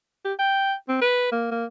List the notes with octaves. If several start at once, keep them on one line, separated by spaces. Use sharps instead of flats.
G4
G5
C4
B4
A#3
A#3